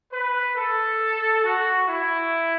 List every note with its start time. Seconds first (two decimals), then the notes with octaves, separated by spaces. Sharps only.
0.13 B4
0.56 A4
1.44 F#4
1.87 E4